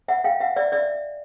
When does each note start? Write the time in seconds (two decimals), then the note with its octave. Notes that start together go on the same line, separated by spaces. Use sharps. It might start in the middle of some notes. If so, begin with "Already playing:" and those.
0.08 E5 F#5
0.24 F5 G5
0.40 E5 F#5
0.56 D5 E5
0.72 D5 E5